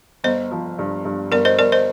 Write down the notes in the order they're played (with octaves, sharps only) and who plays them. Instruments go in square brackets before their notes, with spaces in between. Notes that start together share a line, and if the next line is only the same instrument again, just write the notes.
[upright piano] G1 [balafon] C5 D#5
[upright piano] F3
G2
G2
[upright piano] G1 [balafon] A#4 D5
[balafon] C5 D#5
[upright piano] G1 [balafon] A#4 D5
[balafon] C5 D#5